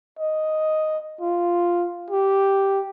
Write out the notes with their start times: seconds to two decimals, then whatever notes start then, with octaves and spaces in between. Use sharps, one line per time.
0.19 D#5
1.21 F4
2.10 G4